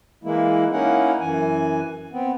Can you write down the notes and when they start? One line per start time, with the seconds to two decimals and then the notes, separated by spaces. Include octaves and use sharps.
0.24 E3 G#3 A#3 E4
0.72 A#3 C#4 D#4 E4 F#5
1.21 F#2 E3 G#5
2.12 B3 C4